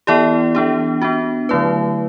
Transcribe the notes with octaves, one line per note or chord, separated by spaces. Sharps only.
E3 B3 E4 G4 D5
E3 B3 D4 G4
B3 D4 F#4
D3 F#3 A3 E4 B4